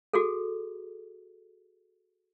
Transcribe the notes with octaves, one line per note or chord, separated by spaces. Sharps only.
F#4 G#4 A4